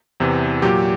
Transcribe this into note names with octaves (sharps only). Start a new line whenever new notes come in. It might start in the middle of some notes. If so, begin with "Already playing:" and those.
E2 C3 E3
A#2 F#3 G4